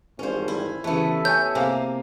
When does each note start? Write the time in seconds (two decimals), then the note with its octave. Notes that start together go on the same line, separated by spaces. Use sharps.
0.19 G#1 E2 G2 C#4 C5
0.48 E4
0.84 C#3 E3 A3 B3 G4 A4 E5
1.25 C#5 G#5 G6
1.55 C3 A#3 F5 G#5